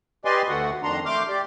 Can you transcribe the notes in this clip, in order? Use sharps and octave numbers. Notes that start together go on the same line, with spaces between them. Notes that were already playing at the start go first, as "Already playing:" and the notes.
G4 B4 D5 D#5 G#5 C6
D2 D3 A3 F#4 F#5
F2 D#3 D4 A#5 C6
A3 C6 D6 F6 G6
G4 D5